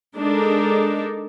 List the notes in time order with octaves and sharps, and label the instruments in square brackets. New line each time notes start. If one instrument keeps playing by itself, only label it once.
[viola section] G#3 D4 D#4 A4 A#4